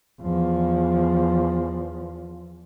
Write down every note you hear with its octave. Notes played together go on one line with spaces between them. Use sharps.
E2 F3